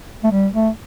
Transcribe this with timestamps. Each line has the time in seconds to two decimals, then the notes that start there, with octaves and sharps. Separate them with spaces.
0.24 A3
0.32 G3
0.54 A3